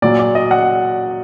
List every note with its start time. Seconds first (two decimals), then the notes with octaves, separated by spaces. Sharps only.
0.02 A#2 F#3 D5
0.19 D5
0.35 D#5
0.51 F#5